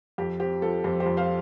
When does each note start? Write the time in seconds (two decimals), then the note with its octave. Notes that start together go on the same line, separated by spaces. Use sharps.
0.18 F2 G4
0.40 C4 G4
0.62 F3 A4
0.84 F2 G4 C5
1.00 G4 C5
1.06 F2
1.17 C5 F5